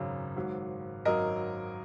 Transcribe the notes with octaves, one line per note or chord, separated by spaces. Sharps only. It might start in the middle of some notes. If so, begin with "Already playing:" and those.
Already playing: G#1 F#2 C#3
G#1 G#2 F#3
G#1 F#2 F#3 A#4 D#5